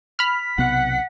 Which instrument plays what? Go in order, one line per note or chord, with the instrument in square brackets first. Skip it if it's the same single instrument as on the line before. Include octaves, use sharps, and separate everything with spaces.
[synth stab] B5 F6 [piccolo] B6
[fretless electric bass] B1 C3 B3 [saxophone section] F#5